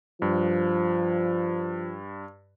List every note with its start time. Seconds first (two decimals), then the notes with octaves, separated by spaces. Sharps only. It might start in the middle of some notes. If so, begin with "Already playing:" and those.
0.22 G2 F3